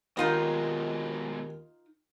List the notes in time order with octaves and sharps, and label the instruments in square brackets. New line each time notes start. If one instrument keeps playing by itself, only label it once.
[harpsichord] D#2 [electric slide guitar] B2 F#3 G#3 [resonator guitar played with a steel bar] D#4 F4 D#5